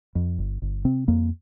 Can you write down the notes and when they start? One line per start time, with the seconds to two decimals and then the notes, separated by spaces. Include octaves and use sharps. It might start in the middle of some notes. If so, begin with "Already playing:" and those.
0.15 F2
0.39 G1
0.62 G1
0.85 C3 C4
1.08 F2 A#3